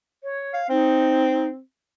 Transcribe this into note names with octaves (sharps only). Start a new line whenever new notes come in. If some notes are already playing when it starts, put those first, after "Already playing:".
C#5
F5
C4 D#4